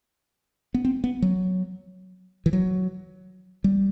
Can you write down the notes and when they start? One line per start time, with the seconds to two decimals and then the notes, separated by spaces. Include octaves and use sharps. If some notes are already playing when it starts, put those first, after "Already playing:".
0.74 B3
0.85 C4
1.04 B3
1.22 F#3
2.46 E3
2.53 F#3
3.64 G3